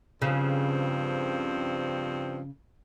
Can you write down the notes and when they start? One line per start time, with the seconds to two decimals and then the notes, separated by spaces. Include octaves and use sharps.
0.22 G2 C#3 F3 C4